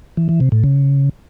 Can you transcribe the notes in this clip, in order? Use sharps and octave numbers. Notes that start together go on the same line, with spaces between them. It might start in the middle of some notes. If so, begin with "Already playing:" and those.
E3
E3
C3
A2
C#3